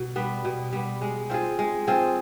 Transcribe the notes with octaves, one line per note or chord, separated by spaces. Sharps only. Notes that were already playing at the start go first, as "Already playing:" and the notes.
Already playing: B2
G3 B3
B2
G3 B3
G#3
C4 F4 G#4
G#3
C4 F4 G#4